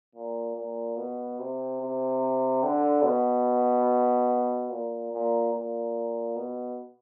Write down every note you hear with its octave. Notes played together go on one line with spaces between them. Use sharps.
A#2
A#2
B2
C3
C3
D3
B2
A#2
A#2
A#2
B2